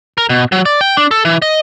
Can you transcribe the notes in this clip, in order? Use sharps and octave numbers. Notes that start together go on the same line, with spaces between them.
A#4
B2
F#3
D5
G5
D4
A4
E3
D#5